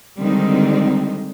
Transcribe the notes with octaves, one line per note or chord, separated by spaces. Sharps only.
D3 D#3 G3 G#3 C4 D#4